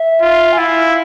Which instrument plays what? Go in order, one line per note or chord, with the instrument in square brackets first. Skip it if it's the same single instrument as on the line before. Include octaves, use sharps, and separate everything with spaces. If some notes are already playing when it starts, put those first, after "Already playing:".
Already playing: [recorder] E5
[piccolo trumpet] F4
[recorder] G#5
[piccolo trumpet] E4 [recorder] F5